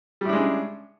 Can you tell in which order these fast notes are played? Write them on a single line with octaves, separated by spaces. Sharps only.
G3 A2 D4 G#3 C#3